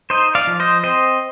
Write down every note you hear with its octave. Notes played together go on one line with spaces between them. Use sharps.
D#4 C5 D#5
D5 F5
F3
C5 D#5
C4 C5 D#5